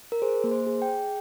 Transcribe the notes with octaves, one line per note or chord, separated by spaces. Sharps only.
A#4
G#4 C5
A#3
C5
G#4
G5
G#4